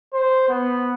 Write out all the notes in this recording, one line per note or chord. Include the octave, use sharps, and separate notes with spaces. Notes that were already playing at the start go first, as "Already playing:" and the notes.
C5
B3